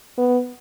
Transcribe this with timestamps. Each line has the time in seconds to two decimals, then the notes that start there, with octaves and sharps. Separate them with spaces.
0.18 B3